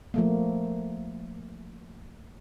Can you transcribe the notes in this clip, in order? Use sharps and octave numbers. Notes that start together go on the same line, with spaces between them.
F3 A3 A#3